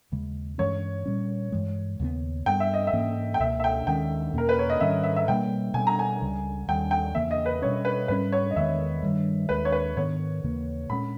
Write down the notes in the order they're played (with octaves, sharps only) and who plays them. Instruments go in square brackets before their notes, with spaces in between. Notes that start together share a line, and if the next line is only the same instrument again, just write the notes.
[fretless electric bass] D#2 C#3 G#3
[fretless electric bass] G2 E3 G#3 C#4 [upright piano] C#5
[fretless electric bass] A#2 G3 C#4
G2 E3 G#3
D#2 C#3 G3 B3
[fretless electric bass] G2 G3 B3 [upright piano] G5
[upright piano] E5
D#5
E5
[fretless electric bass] G#2 E3 A#3 C#4
[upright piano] G5
[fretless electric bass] C#2 B2 A#3 [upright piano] E5
[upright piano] E5
G5
[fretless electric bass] D#2 D#3 G#3 C#4 [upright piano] G5
[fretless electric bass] E2 B2 A#3 C#4 [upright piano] A#4
[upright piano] B4
C#5
D#5
[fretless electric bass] G#2 D#3 G3 C#4 [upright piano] E5
[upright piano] E5
E5
[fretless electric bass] B2 G3 A#3 [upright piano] G5
[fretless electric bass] B2 G3 B3 [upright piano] G#5
[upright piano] A#5
G#5
[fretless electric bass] C#2 C#3 G3
[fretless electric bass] D#2 D#3 G3 [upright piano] G5
[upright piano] G5
[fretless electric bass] E2 C#3 E3 A#3 [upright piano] E5
[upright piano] D#5
B4
[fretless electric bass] B2 G3 C#4 [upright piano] C#5
[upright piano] B4
[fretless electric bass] G#2 G3 A#3 C#4 [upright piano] B4
[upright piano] C#5
D#5
[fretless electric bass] E2 D#3 G#3 B3 [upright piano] E5
[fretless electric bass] G2 D#3 G3
[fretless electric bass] D#2 D#3 G#3 [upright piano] B4
[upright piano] C#5
B4
[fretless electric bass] G#2 D#3 G#3 B3 [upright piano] C#5
[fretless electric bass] D#2 C#3 E3 A#3
[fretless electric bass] A#2 G#3 C#4 [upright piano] B5